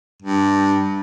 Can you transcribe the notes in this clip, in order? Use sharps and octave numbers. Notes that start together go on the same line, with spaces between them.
G2